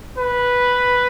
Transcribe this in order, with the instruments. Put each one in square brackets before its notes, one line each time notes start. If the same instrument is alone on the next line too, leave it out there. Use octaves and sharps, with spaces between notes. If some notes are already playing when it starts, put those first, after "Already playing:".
[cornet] B4